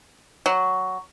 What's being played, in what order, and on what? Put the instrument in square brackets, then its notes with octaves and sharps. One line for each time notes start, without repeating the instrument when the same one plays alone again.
[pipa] F#3